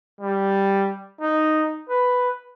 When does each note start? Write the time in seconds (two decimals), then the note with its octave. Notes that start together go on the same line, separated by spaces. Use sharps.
0.21 G3
1.21 D#4
1.90 B4